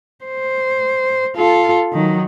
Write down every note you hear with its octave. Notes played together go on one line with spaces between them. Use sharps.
C5
F4 A4
D#3 F#3